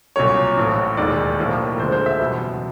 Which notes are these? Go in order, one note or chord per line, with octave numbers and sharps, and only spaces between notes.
C2 A#2 F#3 C#5
A1 A2 F3
E1 D#2 D#3 G#3 D5
B1 A2 F3 A#3
D2 D3 F3 G#3 C5
C5
E5
F#1 E2 B2 G3